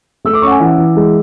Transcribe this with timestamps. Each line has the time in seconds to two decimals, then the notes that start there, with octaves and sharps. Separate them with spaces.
0.25 A3 E6
0.33 D6
0.42 C#4 F#5 C#6
0.51 G#5
0.60 E3 F#5
0.78 E3
0.96 G#3